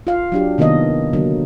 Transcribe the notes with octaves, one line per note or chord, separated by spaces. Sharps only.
F4 F5
F#3 D4 G4
C3 D#3 A#3 B3 D#5
D3 F#3 A#3